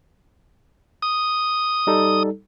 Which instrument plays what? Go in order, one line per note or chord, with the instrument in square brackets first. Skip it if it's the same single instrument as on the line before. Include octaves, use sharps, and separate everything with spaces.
[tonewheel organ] D#6
[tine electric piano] G3 D#4 A4